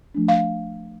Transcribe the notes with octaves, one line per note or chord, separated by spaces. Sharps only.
F3 A3 D4
F5